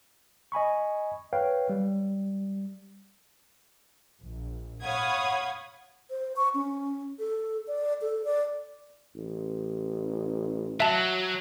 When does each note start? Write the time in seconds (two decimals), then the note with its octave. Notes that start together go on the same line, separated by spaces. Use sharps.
0.52 D#5 G#5 B5 C#6
1.33 B4 C#5 F5 G5
1.70 G3
4.22 A#1
4.83 C#5 F5 F#5 B5 D#6 G#6
6.10 C5
6.36 C#6
6.54 C#4
7.19 A4
7.67 D5
8.01 A4
8.25 D5
9.16 A1
10.80 F#3 E5 A5